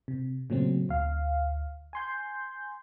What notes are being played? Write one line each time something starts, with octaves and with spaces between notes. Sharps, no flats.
C3
A#2 C#3 F#3 A3 C4
D2 F5
G#5 C6 G6